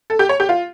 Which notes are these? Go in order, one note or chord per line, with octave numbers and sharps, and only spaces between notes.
A4
G4
C#5
G4
F4